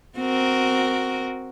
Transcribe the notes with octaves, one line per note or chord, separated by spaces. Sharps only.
C4 F#4 A#4